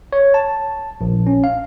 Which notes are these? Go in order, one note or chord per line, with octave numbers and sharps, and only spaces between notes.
C#5
A5
A#1
C#4
F5